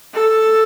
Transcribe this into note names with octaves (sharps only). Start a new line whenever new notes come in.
A4